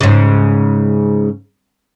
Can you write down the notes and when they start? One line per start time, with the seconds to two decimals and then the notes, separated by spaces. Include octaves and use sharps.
0.01 G#2 C#3